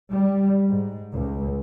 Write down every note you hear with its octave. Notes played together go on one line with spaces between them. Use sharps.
G3
G#2
C#2